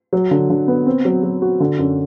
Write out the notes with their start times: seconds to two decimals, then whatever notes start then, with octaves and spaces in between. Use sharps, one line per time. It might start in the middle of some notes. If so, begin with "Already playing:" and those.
0.13 F#3
0.31 D3
0.50 D3
0.68 B3
0.86 C4
1.05 F#3
1.23 F#3
1.42 F#4
1.60 D3
1.79 F#2